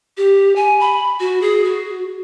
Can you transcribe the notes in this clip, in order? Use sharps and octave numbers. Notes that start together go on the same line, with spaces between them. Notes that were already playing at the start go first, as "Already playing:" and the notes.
G4
G#5
B5
F#4
G#4
F#4